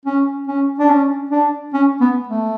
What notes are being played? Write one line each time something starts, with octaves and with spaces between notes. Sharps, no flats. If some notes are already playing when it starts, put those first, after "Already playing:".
C#4
C#4
D4
C#4
D4
C#4
B3
A3